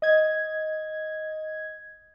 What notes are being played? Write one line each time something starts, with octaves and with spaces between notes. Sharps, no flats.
D#5 G#6